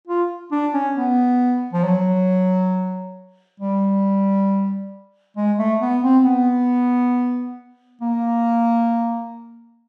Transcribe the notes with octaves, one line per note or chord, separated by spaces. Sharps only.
F4
D4
C#4
B3
F3
F#3
G3
G#3
A3
B3
C4
B3
A#3